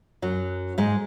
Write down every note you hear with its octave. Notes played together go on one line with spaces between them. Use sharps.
F#2 F#3
G#2 G#3